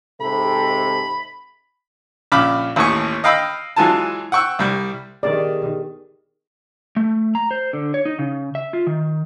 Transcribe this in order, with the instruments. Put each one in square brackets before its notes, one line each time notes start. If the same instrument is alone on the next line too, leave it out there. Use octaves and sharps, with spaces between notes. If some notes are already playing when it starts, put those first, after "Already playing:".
[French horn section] G#2 C3 A4 [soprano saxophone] B5
[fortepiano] A#1 C#3 B5 D6 F6
A1 D#2 A2 G#5 C#6
D#5 F5 G5 B5 E6 F6
E3 F#3 G#3 F4 G#5 A5
F#5 G5 C#6 E6
C2 G3
[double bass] D#3 [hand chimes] B3 G4 G#4 [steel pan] D5
[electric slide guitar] A3
A#5
C5
D3
C#5
D#4
C#3
E5
F4
D#3